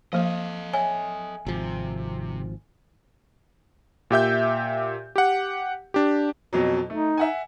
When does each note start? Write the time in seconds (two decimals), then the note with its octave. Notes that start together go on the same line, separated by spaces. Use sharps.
0.13 F3 A#3 A4 D#5 F5
0.74 C#5 E5 G#5
1.47 G#1 C3 F3
4.11 A#2 G4 E5 G6
5.16 G4 F#5
5.94 D4 G4
6.53 F2 B2 F#3
6.90 A3 D#4
7.18 E5 F#5 G#5